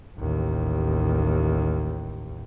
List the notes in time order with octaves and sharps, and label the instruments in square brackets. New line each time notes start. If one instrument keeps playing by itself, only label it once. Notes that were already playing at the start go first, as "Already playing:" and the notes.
[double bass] A1 D#2